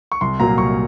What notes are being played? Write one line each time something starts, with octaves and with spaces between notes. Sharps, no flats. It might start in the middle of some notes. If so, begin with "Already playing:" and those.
C#6
C2 C6
A#2 F#3 A#3 A#5
C2 C#6